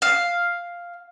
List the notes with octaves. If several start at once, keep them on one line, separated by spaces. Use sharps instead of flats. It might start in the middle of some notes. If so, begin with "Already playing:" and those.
F5